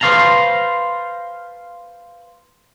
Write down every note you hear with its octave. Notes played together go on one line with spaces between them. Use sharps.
B4 C5 D#5 F5 A5 A#5